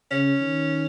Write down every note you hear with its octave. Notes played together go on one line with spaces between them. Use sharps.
C#3 C#4
D#3